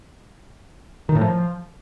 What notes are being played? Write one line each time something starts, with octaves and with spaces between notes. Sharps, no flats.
D#3
A2
F3